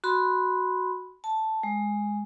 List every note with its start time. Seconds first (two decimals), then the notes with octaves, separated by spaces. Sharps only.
0.04 F#4 B5 C6
1.24 A5
1.63 G#3